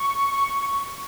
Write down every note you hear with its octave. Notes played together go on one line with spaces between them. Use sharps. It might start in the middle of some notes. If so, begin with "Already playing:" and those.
Already playing: C#6